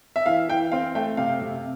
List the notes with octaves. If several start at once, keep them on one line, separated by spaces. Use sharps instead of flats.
E5
E3 F5
E3 G5
C4 F5
A3 G5
C3 F5
C3